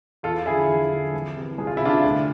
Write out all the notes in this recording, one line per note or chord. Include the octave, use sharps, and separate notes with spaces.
E2 F4 A4
D3 F3 E4 G#4
E2
D3 F3
C2
C3 E3
C2 G#4
F4
E4
C3 E3 D4 F4
D2